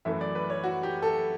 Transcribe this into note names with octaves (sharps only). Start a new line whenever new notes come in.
F#2 E3 A3 E5
D5
B4
C#5
F#4
G4
A4